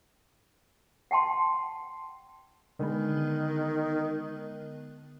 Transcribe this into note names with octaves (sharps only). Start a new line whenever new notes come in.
F#5 G5 A5 C6
D3 D#3 G#3 B3